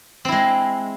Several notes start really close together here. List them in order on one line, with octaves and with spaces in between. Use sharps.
C4 E4 G#3